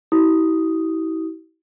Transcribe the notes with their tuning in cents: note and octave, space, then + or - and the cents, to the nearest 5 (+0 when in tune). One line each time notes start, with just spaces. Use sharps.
E4 -35 G4 -45 D#6 +0